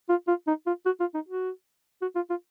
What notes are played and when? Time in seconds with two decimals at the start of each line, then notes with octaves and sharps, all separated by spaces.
0.09 F4
0.28 F4
0.47 D#4
0.66 F4
0.85 F#4
1.00 F4
1.14 D#4
1.28 F#4
2.02 F#4
2.15 F4
2.30 F4